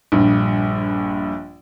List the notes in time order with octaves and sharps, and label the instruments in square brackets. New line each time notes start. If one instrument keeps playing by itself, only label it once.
[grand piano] A#1 G2